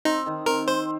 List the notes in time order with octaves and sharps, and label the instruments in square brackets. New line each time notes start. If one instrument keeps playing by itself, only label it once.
[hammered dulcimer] C4 [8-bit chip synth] D#4
[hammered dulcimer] D#3
[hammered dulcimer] C4 [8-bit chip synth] A#4
[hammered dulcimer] C4 [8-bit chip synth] C5